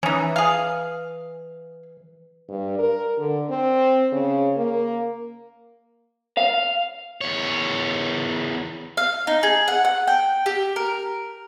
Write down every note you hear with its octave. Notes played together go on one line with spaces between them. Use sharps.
E3 C#4 D#4
G#4 F5
G2
A#4
D3
C4
C#3
A#3
F5
E2 C#5
F5
D#4
G#4
F#5
F#5
G5
G4
A#4